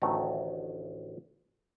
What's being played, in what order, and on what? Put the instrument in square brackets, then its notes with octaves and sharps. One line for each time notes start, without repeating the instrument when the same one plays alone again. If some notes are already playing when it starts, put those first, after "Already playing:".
[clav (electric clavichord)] A1 D2 D#3 F#3 A3 A#5